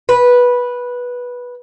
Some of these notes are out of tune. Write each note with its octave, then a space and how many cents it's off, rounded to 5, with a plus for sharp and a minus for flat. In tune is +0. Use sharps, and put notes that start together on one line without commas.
B4 -10